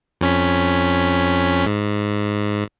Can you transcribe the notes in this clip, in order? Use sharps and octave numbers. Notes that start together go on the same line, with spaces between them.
F2 C#4 B6
G#2